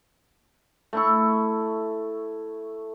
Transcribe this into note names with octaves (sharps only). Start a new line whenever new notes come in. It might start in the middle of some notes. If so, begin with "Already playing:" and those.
A3 E4 C#6